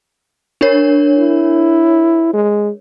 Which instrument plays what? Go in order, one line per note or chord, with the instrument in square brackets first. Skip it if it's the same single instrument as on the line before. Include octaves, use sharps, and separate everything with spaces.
[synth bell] D4 A#4 C#5
[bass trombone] E4
G#3